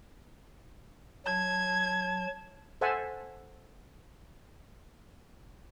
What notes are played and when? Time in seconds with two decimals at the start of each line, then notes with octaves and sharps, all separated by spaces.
1.26 F#3 A5 G#6
2.81 A4 C5 E5 F#5 G#5 A5